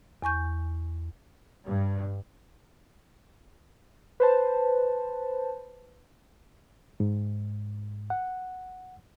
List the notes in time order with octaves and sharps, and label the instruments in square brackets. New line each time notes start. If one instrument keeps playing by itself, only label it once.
[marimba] E2 G#5 C#6 G6
[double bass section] G2
[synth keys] B4 C5 A5
[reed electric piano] G#2
F#5